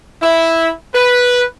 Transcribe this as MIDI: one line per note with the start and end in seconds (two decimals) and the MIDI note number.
0.21 0.71 64
0.94 1.44 71